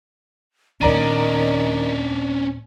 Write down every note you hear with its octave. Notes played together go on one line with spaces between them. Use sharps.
D#2 A#2 D#3 C#4 D4 D5 A#5 D#7